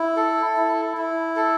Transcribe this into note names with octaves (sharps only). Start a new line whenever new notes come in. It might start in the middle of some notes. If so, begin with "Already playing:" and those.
Already playing: E4
A4
E4
E4
A4